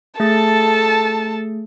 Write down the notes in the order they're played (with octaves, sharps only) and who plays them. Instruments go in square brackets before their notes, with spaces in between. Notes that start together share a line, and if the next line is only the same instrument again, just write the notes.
[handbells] A3 G#4 A6 [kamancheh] A4 A5